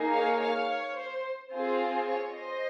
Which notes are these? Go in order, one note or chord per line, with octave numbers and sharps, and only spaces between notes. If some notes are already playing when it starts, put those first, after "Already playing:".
Already playing: A#3 D#4 G#4
C#5 F5
C#5 F5
C#5
C5
C4 F4 G#4 C5
C5
C#5
C5 D#5